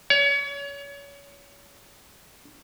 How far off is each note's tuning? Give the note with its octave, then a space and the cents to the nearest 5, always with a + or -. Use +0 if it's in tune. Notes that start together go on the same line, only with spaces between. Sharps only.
C#5 +30